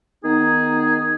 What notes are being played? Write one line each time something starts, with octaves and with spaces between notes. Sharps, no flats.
D#3 B3 D#4 G#4